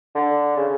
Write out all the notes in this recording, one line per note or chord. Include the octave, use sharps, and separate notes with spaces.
D3
C#3